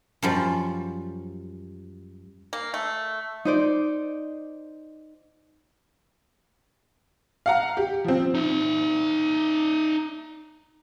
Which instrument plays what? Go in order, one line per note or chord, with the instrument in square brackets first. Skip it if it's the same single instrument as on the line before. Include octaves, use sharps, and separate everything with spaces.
[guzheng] F#2 F3 G3
[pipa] A#3
A3
[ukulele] D#4 C5 D5
[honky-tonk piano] F5 F#5 A#5
G4
F3 C4
[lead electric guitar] D#4 E5